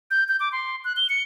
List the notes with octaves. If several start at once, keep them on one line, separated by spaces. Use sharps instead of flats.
G6
G6
D6
C6
F#6
G7
C#7